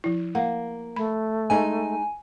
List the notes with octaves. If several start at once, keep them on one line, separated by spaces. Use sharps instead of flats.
F3 E4
A#3 F#5
A3 B5
G#3 D#4 G#5